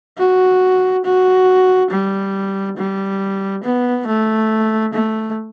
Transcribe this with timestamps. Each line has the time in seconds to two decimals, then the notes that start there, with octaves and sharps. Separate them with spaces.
0.18 F#4
1.05 F#4
1.91 G3
2.78 G3
3.64 B3
4.07 A3
4.94 A3